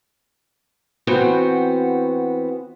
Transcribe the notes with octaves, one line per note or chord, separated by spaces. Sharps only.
E3 B3 C4 F#4 G5